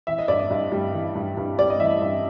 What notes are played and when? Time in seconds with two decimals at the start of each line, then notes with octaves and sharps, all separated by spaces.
0.07 E3 E5
0.19 D#5
0.28 G2 D5
0.40 D#5
0.50 G2
0.72 G3
0.93 E3
1.15 G2
1.37 G2
1.58 G3 D5
1.70 D#5
1.80 E3 E5
2.02 G2